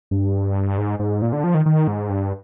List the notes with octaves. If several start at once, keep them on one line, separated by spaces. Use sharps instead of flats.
G2
G#2
G#2
A#2
D3
F3
D#3
D#3
G#2
G2